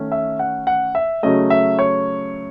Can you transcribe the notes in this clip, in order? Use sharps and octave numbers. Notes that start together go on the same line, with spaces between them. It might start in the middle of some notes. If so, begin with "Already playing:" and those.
Already playing: D#3 A3 C#4
E5
F#5
F#5
E5
C#3 F#3 A3 C#4 D#5
E5
C#5